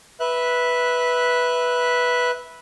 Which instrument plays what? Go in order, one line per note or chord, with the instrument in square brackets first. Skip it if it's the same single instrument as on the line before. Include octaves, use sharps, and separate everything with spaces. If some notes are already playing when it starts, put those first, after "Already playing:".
[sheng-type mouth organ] B4 E5 F#6